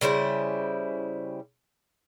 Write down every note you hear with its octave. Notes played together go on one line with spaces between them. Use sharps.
C#3 G3 E4 C5